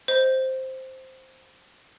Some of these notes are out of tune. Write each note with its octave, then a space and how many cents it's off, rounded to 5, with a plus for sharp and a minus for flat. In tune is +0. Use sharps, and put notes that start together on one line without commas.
C5 +0 D#5 +10